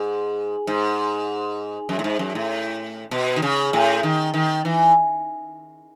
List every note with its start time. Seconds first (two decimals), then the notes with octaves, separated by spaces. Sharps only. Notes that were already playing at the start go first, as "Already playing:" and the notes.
Already playing: G#2
0.67 G#2
1.89 F#2
1.99 A2
2.04 G#2
2.19 F#2
2.35 A2
3.11 B2
3.36 D#3
3.42 C#3
3.73 A2
4.03 D#3
4.34 D#3
4.65 E3